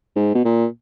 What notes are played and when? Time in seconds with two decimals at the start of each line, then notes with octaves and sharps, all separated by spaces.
0.16 G#2
0.35 B2
0.45 A#2